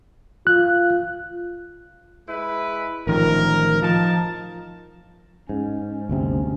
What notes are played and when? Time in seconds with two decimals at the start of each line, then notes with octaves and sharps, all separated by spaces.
0.47 F4 F#6
2.28 G#3 E4 B4
3.07 A1 D#3 F3 A#4
3.82 F3 D#4 A5
5.49 G#2 C#4
6.09 G1 D2 C3